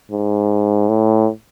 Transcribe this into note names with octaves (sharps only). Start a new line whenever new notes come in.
G#2
A2